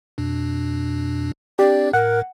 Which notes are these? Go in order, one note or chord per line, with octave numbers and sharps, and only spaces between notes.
F2 B2 D4
C4 D4 G4 D5
A2 A#4 F#5